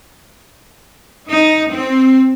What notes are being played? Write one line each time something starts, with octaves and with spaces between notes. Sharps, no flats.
D#4
C4